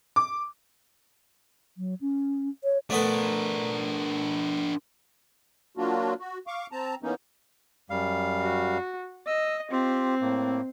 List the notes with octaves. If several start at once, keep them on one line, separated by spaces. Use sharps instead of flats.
D6
F#3
C#4
C#5
A3 B3 D4 A4 A#4
F#3 A#3 D4 F4 F#4
F#4
F5 C#6 D6
C4 A5 A#5
E3 A#3 B3 C#4 D#4
F#2 G3 F5
F#4
D#5 E6
C4 F4 G4
A2 A#3